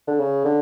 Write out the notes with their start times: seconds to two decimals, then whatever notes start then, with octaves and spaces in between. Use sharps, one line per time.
0.07 D3
0.20 C#3
0.44 D3